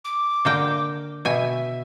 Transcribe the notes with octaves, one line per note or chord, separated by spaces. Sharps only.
D6
D3 A#3 G5
B2 E5 G#5